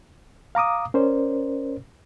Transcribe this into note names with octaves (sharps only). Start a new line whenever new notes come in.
F5 A#5 D6 D#6
C#4 A#4 C5 D5